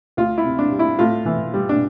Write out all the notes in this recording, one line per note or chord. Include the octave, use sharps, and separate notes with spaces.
D2 F4
E4
C3
D4
G3
E4
A2 F4
E3
G3
D4